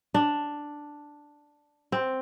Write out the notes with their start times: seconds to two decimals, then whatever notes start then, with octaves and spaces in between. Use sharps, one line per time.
0.14 D4
1.92 C4